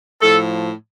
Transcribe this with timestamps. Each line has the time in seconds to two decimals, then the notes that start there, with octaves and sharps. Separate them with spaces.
0.21 A2 F3 A4